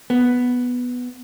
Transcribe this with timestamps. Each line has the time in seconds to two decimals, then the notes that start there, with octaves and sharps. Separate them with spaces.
0.10 B3